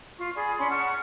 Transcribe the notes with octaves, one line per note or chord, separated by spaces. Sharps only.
F4 C#6
G#4 D5 B5
C#4 B5 C6
F#5 A5 C#6 F6